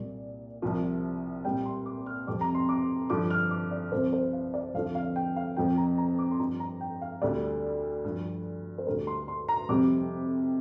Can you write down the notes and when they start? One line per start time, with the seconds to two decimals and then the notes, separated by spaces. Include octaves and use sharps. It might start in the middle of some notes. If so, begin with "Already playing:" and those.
Already playing: C2 A#2 G3 D5
0.62 C2 C3 F3
1.45 C2 A#2 G3 G5
1.65 C6
1.86 D6
2.06 F6
2.27 F2 C3 G3 D6
2.41 A#5
2.55 C6
2.69 D6
3.10 G2 D3 F3 D6
3.30 F6
3.51 D6
3.71 D5
3.92 C2 C3 F3 C5
4.13 C5
4.33 F5
4.54 D5
4.74 F2 D3 F3 F5
4.95 F5
5.16 G5
5.36 F5
5.57 F2 F3 G5
5.77 A#5
5.98 A#5
6.19 D6
6.31 C6
6.39 G2 F3 A#5
6.60 A#5
6.81 G5
7.01 F5
7.22 D2 D3 G3 D5
8.04 G2 F3
8.78 C5
8.86 D2 D3 G3 A#4
9.07 C6
9.28 C6
9.48 A#5
9.69 F2 C3 G3 D6